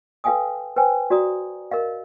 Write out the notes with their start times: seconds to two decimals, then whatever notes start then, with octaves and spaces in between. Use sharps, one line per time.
0.24 A4 B4 F5 G5 G#5 D#6
0.76 B4 C5 G5 G#5
1.10 F#4 D5 A#5 D#6
1.71 A#4 D#5 F5